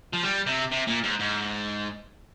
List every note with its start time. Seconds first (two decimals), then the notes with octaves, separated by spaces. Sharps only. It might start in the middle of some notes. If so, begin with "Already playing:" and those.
0.13 F3
0.23 G3
0.46 C3
0.71 C3
0.87 A#2
1.04 G#2
1.20 G#2